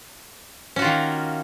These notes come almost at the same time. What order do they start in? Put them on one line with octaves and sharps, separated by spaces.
C#4 F#4 F4 D#3 A#3